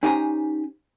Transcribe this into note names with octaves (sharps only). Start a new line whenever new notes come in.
C#4 D#4 G4 C5 G#5 A#5